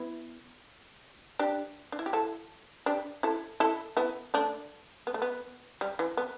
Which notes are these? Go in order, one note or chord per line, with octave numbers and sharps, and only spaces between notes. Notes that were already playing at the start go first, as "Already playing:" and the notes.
Already playing: B3 E4
D4 G4
D4
E4
G4
E4 A4
D4 G4
E4 A4
E4 A4
B3 E4
A3 D4
B3
A3
B3
G3
E3
B3